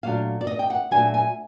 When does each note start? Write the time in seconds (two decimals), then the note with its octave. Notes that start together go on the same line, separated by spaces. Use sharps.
0.03 A#2 F#3 A3 D4 F5
0.41 D5
0.47 D#5
0.59 G5
0.70 F#5
0.91 A#2 F#3 A3 D4 G#5
1.14 G#5